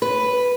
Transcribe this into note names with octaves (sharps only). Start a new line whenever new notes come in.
B4